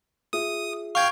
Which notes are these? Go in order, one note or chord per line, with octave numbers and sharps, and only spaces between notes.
F4 G#4 E5 D#6
F5 G5 C#6 F6 G#6